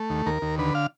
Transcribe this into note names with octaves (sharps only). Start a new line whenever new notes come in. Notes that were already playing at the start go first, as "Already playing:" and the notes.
Already playing: A3
D#2
D#2 A#4
D#2
D3 B4
F5